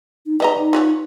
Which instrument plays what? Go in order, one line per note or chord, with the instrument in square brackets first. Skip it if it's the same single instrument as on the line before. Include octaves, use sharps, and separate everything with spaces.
[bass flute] D#4
[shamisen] G3 D#5 A#5 [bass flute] B4
[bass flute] D#4
[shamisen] F4 B4 C#5